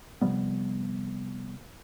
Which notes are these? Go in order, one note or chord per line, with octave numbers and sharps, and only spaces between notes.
C3 F3 G3 B3